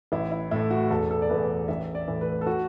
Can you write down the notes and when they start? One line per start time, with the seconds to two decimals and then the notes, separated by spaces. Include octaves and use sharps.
0.12 A1 E4
0.32 E4
0.51 A2 A3 E4
0.71 F#4
0.90 E1 A4
1.11 A4
1.22 D5
1.29 E2 E3 A3 B4
1.68 A1 E5
1.95 D5
2.08 A2 E3 A3
2.21 B4
2.41 A4
2.47 F#4